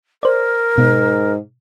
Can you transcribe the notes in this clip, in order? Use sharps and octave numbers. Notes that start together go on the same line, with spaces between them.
A#4 C5 D5
G#2 B2